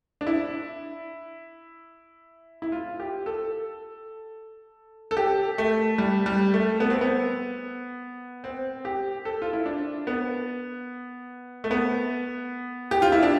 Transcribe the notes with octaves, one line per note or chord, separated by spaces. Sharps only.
D4
E4
E4
F4
G4
A4
A4
G4
A3
G3
G3
A3
B3
C4
B3
C4
G4
A4
F4
E4
D4
B3
A3
B3
G4
F4
E4
D4